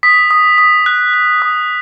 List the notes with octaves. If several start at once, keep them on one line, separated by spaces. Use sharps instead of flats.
D#6 B6
D#6
D#6
F#6
F#6
D#6